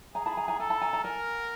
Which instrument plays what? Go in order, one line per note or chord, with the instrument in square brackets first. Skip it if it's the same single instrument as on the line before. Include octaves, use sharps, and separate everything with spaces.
[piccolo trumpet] G#4 [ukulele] G#5 A#5
[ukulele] A5 B5
G#5 A#5
G#5 A#5
[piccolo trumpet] A4 [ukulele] G#5 A#5
[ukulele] A5 B5
G#5 A#5
G#5 A#5
[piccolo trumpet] A#4 [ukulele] F#5 G#5